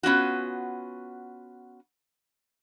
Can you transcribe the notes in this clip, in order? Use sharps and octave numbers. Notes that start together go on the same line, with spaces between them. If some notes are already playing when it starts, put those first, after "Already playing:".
B3 C#4 F4 F#4